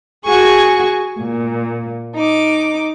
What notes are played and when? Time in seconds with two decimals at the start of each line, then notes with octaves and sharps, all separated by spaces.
0.25 F#4 G#4 G#5 C#6
1.20 A#2
2.15 D#4 D6